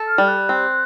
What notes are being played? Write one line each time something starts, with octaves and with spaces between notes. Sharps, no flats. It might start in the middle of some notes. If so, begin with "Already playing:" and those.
Already playing: A4
F6
G3
F#6
C4